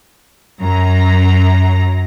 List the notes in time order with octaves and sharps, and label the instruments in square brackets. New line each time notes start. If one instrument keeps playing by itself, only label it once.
[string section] F#2 A#5